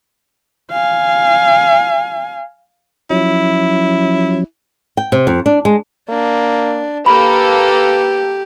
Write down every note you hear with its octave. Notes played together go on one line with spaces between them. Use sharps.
F5 G#5
F3 F#3 C#4 E4
G5
C3
F2
D4
G#3
A#3 D4
A#3 G4 A4 B4 B5